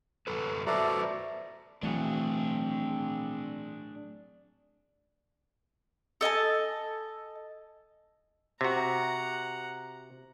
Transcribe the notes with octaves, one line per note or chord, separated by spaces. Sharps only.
F#2 A4 B4
F#4 A4 B4 C5 D5 E5 A#5
D2 A2 E3 F#3 A3 C4 D4 G#4
A4 D#5 G#5 A5
C3 F#4 F#5 A#5